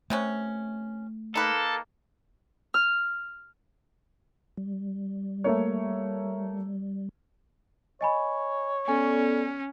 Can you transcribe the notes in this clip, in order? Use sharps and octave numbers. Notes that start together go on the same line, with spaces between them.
C3 A3 B3 C#4
A#3 D#4 A4 B4
F6
G3
A3 A#3 C#5
C#5 D#5 G#5 B5
B3 C#4 A4 D5 G#5